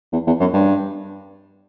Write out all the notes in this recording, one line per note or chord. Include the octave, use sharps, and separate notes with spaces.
E2
E2
F#2
G2